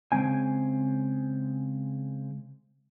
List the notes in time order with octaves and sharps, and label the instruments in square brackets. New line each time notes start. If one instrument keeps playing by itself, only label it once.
[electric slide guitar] C#3 G#3 C4 G#5